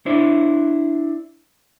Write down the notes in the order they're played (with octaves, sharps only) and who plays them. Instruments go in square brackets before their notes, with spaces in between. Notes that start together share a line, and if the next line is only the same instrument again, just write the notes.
[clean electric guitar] D4 E4 C5